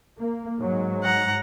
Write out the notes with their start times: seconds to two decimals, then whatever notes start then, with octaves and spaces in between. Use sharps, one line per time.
0.19 A#3
0.60 G#2 F#3
1.04 F#5 A#5